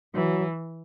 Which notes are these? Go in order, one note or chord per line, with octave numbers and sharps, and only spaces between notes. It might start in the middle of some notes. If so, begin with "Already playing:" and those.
E3 F#3